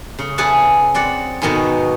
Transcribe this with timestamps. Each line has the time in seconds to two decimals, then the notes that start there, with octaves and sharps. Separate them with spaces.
0.19 C#3
0.38 G#4 B4 E5 F#5 A5
0.95 C4 D5 F#5
1.42 G#2 B2 D#3 B3 F#4